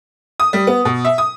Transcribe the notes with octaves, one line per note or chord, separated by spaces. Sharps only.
D#6
G3
B3
B2
E5
D#6